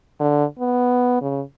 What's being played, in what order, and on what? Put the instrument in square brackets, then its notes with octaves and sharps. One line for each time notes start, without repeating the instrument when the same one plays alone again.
[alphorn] D3
B3
C#3